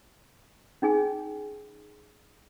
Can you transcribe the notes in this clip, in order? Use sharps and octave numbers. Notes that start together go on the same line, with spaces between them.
C#4 D#4 G#4 G#5